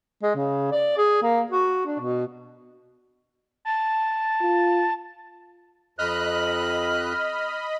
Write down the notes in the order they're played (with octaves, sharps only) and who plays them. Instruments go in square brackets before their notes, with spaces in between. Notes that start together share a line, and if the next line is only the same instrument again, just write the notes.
[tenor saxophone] G#3
C#3
D5
G#4
A#3
F#4
D4
B2
[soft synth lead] A5
[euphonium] F4
[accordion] F2 F#6 [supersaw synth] D#5 B5 [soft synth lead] F6